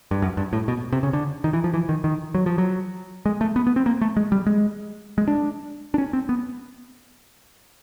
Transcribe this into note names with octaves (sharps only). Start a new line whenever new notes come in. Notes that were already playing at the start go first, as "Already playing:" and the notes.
G2
F#2
G2
A2
B2
C3
C#3
D3
D#3
E3
F3
E3
D#3
D#3
F#3
F3
F#3
G#3
A3
B3
B3
C4
A#3
A3
G#3
G3
G#3
G#3
D4
D4
C#4
C4
B3